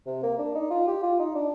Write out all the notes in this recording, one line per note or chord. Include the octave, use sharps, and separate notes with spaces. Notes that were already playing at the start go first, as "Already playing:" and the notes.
C3
A#3
D4
D#4
F4
G4
F4
D#4
D4